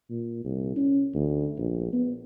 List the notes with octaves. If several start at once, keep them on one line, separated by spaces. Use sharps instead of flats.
A#2
C2
C#4
D2
A#1
B3